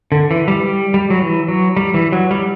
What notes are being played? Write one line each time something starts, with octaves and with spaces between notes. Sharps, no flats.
D3
E3
G3
G3
G3
F#3
E3
F#3
G3
E3
F#3
G3